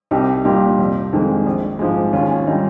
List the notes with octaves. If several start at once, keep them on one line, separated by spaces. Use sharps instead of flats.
C2 D#4 G4
A#2 G3 D#4 G4
F1
F2 D#3 G#3
A#1
G#2 F3 G#3
D#2 C#4 F4
C#4
D#3 G3 D#4